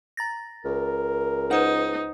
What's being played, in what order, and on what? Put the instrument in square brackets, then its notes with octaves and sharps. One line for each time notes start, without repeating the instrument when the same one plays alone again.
[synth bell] A#5 A6 A#6
[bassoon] C#2 [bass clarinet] A#4
[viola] D#4 [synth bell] B4 C5 F#5